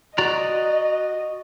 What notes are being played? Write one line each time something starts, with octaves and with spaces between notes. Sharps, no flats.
F#4 D5 D#5 A#5